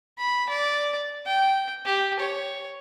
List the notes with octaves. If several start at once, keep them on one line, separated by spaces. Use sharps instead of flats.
B5
D5
G5
G4
C#5